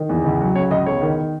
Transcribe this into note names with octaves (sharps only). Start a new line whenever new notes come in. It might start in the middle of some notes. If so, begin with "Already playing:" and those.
Already playing: D#3
E2
C#2
F#3
C#3 C#5
C#2 D#5
E1 C#5
D#3